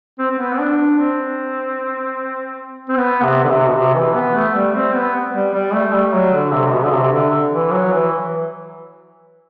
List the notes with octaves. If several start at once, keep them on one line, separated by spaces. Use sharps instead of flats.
C4
C4
B3
C4
D4
C4
C4
B3
C3
D3
C3
B2
C3
E3
B3
A3
G3
C4
B3
G3
G3
A3
G3
F#3
D3
C3
C3
B2
D3
C3
D3
E3
F#3
E3